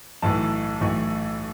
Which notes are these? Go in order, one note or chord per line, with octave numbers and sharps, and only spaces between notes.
B1 A2 E3 A5
B1 A2 E3 C#6